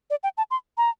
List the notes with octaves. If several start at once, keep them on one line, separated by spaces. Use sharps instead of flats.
D5
G5
A5
C6
A#5